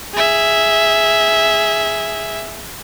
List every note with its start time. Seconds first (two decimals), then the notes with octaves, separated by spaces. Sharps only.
0.14 G#4 E5